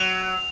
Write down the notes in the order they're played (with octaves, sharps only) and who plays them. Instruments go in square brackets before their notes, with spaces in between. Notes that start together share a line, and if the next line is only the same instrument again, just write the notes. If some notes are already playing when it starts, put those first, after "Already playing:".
Already playing: [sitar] F#3 [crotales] F7